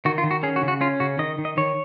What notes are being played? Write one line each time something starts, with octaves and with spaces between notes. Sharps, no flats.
D#3 F#4
F4
D#3
F#4
C#4 G#4
F#4
C#3
F#4
C#4 F4
C#3 F#4
D#3 D#5
D#3
D#5
D#3 C#5